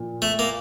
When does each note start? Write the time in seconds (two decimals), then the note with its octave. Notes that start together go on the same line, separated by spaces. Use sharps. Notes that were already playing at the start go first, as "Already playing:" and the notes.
Already playing: A#2 F3 A#3 F4
0.22 A3
0.39 A#3